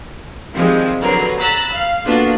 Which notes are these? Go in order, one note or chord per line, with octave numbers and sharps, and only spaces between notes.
D#3 F3 G3 G#3 C4
D3 F#3 A#4 B4 C7
A#5 B5 E6 F#6 A6 B6
F5
A#3 B3 D4 F4 F#4 A4